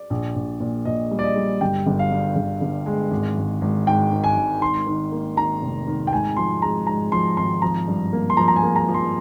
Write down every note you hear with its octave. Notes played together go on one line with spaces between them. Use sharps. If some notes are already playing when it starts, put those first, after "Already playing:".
Already playing: D5
A#1
A#1
A#2
A#2 D#5
G3
D5
D#5
G3
G1 G5
G1
F5
G2
G1
G1
G#3
G#1
G#1
G#1
G#2 G5
D#3
G#5
G#1
D#3 C6
D#3
A#3
D#3 A#5
F1
D#3
G5
G#2 G#5
F3 C6
G#3 A#5
G#2 A#5
F3 C6
G#1 C6
F3 A#5
G2
A#3
C6
F3 A#5
A#5
G#5
A#3
A#5
F3
C6